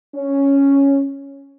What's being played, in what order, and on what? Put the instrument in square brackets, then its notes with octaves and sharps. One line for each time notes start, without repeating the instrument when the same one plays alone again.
[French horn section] C#4